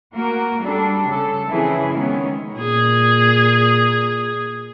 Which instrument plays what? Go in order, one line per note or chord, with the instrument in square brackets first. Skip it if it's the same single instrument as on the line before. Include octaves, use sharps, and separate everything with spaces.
[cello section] A#3 F#4 A#4
G3 D4 A4
C#3 A4
C#3 E3 F3 C4 E4 G#4
D#3 G#3 B3 C#4
[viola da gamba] A#2 G#4